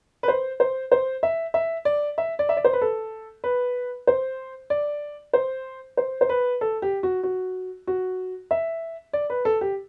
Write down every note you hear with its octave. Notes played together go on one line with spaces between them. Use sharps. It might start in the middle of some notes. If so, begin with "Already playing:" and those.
B4
C5
C5
C5
E5
E5
D5
E5
D5
E5
D5
C5
B4
A4
B4
C5
D5
C5
C5
C5
B4
A4
G4
F#4
F#4
F#4
E5
D5
B4
A4
G4